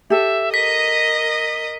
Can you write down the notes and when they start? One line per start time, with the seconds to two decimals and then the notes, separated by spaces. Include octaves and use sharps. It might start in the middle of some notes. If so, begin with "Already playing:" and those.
0.10 G4 A4 E5
0.54 A#4 D#5 D#6 A#6 B6